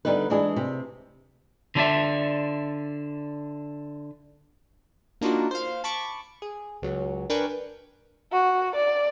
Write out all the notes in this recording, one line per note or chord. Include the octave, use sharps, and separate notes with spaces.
D3 G3 B3 D#4 B4
E3 G#3 D4 E4 G#4
C3
D3 F#3 D4 F4 D5 E5
A#3 D4 D#4 F4 F#4
C5 F5
A5 B5 C#6 D6
G#4
C#2 F#3
D4 A#4 B4 G5 G#5 C#6
F#4
D5